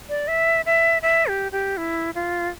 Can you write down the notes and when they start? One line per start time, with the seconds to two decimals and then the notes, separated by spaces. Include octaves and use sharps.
0.09 D5
0.28 E5
0.66 E5
1.02 E5
1.27 G4
1.52 G4
1.77 E4
2.15 F4